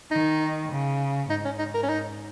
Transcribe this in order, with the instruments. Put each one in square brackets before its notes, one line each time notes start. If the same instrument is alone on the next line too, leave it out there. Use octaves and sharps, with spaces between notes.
[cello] D#3 [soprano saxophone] D#4
[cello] C#3
[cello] G#2 [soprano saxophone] D#4
[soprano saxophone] C#4
D#4
A#4
C#4
D#4